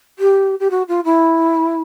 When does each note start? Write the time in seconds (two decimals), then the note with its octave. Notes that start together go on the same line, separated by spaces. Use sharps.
0.19 G4
0.60 G4
0.70 F#4
0.88 F4
1.05 E4